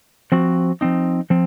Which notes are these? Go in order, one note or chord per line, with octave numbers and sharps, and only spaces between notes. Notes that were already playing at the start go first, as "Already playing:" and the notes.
F3 C4 F#4
F3 C4 D#4
F3 C4